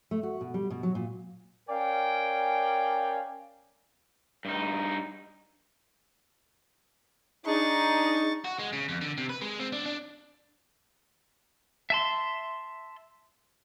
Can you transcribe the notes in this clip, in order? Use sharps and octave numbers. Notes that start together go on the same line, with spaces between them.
A3
F#4
B2
G3
B2
F#3
A#2
C#4 A#4 D5 F5 G5 G#5
G2 D#4
D4 D#4 G#4 C#6 A6
F#4
G#3
C#3
F2
D3
C3
B4
G#3
C4
D4
D4
E5 A5 C6